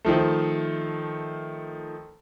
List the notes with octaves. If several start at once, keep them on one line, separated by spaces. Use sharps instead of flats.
D#3 F3 A3